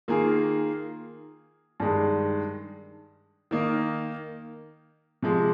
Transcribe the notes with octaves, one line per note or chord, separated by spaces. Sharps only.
D#3 A#3 F4 G#4
G2 D#3 G#3
D#3 A#3 D#4
C3 F3 G#3